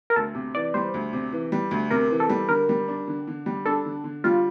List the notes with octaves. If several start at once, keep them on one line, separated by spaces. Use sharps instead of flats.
A#4
D2 A4
C3
E3 D5
G3 C5
D2
C3
E3
G3
D2
C3 A#4
E3
A4
G3
D3 A#4
G3
D4
D3
D3
G3
D4 A4
D3
D3
G3 F4